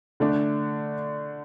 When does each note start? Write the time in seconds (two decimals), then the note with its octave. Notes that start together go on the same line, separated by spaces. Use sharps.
0.20 D3 A3 D4